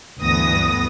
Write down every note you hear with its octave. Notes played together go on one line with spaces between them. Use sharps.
D2 G2 E3 B3 D#6 A#6